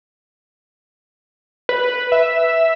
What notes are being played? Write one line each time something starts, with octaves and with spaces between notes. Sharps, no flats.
B4
E5